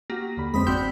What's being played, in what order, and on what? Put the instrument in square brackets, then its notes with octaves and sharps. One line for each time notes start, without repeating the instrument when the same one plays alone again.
[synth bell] A#3 [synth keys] F#4 G4 [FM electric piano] A#6
[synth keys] D#2 D3 B5
[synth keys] F2 [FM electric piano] G#3 C4 C5 [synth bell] B5 D#6 B6
[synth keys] G#1 D5 [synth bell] C4 G5 B6 [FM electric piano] F#4 E6 G6